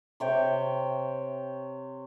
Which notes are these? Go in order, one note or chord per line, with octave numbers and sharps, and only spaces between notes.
C3 C#5 G5